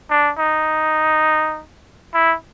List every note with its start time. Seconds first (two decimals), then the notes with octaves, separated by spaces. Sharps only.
0.10 D4
0.39 D#4
2.14 E4